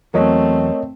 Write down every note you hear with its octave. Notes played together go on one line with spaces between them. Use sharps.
E2 F#3 A3 C4 A#4 C#5 D#5